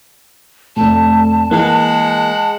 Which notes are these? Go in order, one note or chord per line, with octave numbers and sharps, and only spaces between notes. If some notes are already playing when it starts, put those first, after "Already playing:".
F1 A2 A5
E3 G#3 A#3 E4 F#5